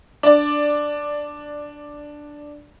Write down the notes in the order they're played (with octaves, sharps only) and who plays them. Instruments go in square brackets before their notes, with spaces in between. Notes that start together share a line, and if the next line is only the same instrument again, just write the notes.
[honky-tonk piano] D4 D5